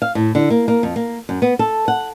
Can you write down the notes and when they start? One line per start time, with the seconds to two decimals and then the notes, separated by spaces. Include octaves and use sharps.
0.02 F5
0.15 A2
0.35 D3
0.50 A#3
0.68 A#3
0.83 F2
0.96 A#3
1.29 F#2
1.42 B3
1.59 A4
1.88 F#5